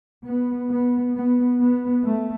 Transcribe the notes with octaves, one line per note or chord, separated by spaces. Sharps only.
B3
B3
B3
B3
A3